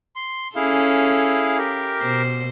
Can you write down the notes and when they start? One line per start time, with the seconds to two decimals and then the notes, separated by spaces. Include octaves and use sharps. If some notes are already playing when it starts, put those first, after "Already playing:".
0.16 C6
0.56 C#4 E4 G#4 A4 F5
1.58 G4 A#4
2.01 B2 C5